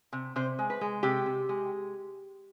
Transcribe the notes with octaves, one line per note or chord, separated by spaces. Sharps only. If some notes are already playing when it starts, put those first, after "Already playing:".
C3
C3 C5
G#3
B4
G#3
C3 G4
C3
G#3